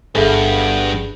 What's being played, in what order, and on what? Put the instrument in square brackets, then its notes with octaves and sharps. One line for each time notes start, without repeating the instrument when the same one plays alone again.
[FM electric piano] G1 G#4 [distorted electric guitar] G2 [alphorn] B3 [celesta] A4 E5